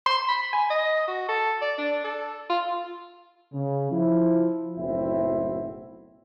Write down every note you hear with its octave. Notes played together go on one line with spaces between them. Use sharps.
C6
B5
G#5
D#5
F#4
A4
D5
D4
A4
F4
C#3
F3 E4
F#1 B1 A2 C4 E4 E5